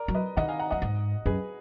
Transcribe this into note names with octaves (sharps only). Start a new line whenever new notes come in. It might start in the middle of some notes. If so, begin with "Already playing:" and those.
Already playing: A#4 D5
F#3
B4 D#5
D#3 D#5 F#5
F5 G#5
F#5 A#5
F#2 D#5 F#5
G#2
F#2 G#4 B4